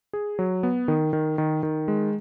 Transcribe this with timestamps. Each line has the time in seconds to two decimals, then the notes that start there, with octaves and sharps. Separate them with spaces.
0.13 G#4
0.39 F#3
0.63 B3
0.88 D#3
1.13 D#3
1.38 D#3
1.63 D#3
1.88 G#3